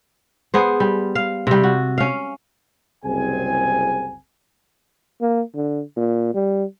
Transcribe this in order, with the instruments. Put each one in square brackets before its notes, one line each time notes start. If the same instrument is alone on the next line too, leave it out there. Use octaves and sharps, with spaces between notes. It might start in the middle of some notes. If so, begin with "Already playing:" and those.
[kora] B3 G#4 C5
G3
F5
C3 G3
F#4
C#4 F5
[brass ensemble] F#1 C2 C4 G#4 G#5
[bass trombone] A#3
D3
A#2
G3